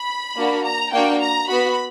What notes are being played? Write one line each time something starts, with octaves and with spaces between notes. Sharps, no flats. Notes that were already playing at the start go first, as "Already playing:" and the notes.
Already playing: B5
A#3 D4 F#4
A#5
A#3 D4 F#4 G5
A#5
B3 F#4 B5